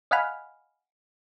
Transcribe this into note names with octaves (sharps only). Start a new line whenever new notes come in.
D#5 F5 F#5 G#5 B5 F6